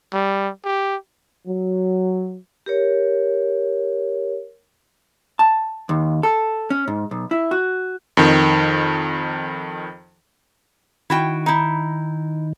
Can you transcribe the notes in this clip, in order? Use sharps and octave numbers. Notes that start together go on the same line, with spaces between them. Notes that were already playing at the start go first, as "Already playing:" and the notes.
G3
G4
F#3
G4 A#4 C#5
A5
D#2
A4
C#4
G#2
B1
E4
F#4
F2 D#3
D#3 E4 F#4 G5
D#4 E4